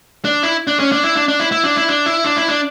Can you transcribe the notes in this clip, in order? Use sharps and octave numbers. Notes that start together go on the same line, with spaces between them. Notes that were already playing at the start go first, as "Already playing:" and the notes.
D4
E4
D4
C#4
D4
E4
D4
D4
E4
E4
D4
E4
D4
E4
D4
E4
D4